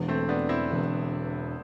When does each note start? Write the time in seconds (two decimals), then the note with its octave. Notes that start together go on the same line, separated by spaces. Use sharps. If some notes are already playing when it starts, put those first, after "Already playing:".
Already playing: E1 E2 D3
0.08 A3 C4
0.29 B3 D4
0.49 C4 E4
0.70 E1 E2 D3